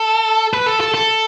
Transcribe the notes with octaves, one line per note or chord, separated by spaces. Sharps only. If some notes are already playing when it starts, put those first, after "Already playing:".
Already playing: A4
B4
A4
A4
A4